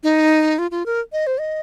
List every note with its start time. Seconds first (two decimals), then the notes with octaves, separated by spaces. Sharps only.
0.03 D#4
0.59 F4
0.71 F4
0.86 A#4
1.13 D#5
1.27 C5
1.40 D#5